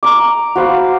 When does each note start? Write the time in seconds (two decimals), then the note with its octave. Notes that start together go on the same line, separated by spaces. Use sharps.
0.03 A#5 D6
0.55 F#4 C5 F5 B5